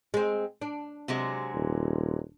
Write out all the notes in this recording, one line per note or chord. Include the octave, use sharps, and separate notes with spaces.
G#3 C4
D4
C3 F#3 G#3
D#1